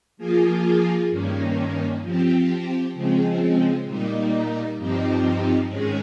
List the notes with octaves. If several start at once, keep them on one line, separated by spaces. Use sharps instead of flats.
F3 A#3 F4 G#4
G2 D#3 A#3 C#4
F3 C4 G4
C#3 F3 G#3 C4
A#2 G3 A#3 D#4
G2 F3 C4 D#4 G4
G#2 D#3 G#3 C#4 G#4